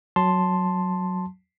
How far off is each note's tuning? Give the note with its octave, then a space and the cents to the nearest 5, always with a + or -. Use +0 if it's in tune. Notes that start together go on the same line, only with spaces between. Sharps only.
F#3 +0 A5 +0 C6 +0